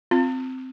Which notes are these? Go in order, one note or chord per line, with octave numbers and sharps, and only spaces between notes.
C4 F4